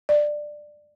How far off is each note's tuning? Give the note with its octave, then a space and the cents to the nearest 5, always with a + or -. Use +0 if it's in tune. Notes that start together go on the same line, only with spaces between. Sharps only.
D5 +15